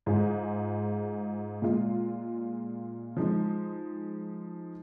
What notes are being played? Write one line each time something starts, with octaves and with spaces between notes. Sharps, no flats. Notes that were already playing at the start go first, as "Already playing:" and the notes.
G#2 G#3 F4 G#4
A#2 G#3 F4
F3 G#3 D#4